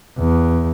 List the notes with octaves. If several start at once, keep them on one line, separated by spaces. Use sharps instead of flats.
E2